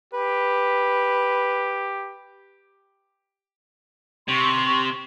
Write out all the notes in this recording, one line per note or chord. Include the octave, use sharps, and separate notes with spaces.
G4 B4
C3 C6 C#6